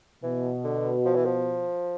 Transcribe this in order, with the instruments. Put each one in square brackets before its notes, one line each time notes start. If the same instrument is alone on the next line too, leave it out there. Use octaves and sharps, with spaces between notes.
[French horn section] B2 [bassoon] E3
[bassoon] D3
F3
E3
F3